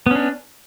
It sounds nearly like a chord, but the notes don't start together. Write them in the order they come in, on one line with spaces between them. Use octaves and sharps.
B3 C#4 D4